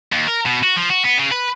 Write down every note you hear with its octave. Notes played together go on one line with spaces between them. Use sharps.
D#2
A#4
B2
F#4
F3
F#4
B3
C#3
B4